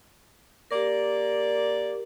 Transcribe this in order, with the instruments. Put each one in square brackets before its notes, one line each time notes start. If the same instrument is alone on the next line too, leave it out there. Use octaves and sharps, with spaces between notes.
[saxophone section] A#3 D5 [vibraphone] G4 A#4